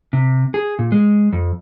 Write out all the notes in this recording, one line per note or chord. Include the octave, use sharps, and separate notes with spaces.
C3
G#4
A#2
G#3
F2